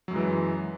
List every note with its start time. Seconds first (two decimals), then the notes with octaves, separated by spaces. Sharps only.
0.08 F#3
0.11 F#2
0.13 G#3
0.16 E3